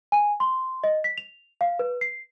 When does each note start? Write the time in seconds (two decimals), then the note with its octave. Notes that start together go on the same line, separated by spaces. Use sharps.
0.12 G#5
0.40 C6
0.84 D#5
1.04 B6
1.18 F7
1.61 F5
1.79 B4
2.01 C7